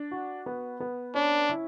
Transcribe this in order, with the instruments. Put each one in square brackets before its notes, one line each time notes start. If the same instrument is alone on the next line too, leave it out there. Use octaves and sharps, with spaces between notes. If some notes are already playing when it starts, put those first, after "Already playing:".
Already playing: [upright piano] D4
F#4
B3
B3
[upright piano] C#4 [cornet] D4
[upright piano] E4